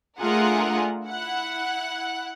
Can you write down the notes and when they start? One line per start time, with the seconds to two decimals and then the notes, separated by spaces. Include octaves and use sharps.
0.20 A3 D4 F4 G#4 A#4 F#5
1.04 E4 F#5